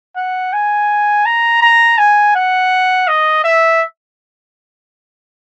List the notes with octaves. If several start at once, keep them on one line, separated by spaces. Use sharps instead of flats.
F#5
G#5
A#5
A#5
G#5
F#5
D#5
E5